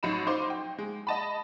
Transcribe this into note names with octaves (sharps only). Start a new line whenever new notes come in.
A1 F#3 D#4 B5 E7
F3 D#4 C5 C6 D6
G5
G#3
D#5 A5 B5